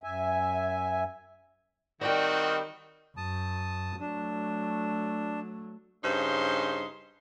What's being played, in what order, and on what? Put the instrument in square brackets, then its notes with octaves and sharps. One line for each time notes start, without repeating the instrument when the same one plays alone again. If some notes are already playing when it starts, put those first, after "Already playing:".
[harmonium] F#2 E5 G#5
[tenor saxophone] D#3 [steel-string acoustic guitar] G3 G4 G5 [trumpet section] C4 D#4 F#4
[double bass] F#2 [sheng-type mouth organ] A5 D#6
[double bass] F#3 A3 [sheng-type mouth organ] D4
[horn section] G2 C#3 D#4 C5 C6